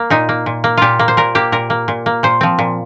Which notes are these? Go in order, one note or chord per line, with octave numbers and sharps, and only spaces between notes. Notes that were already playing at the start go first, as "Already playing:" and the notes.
Already playing: A#3
A#2 D#4
A#3
A#2
A#3
A#2 F4 G4
A#3
C5
A#2 A#4
A#3 G4
A#2 A#4
A#3
A#2
A#3
A#2 C5
F3 C4
A#2